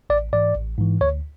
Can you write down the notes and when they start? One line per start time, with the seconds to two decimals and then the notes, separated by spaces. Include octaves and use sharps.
0.10 A1 D5
0.33 G#2 E3 D5
0.56 A1
0.78 G#2 E3
1.01 D2 C#5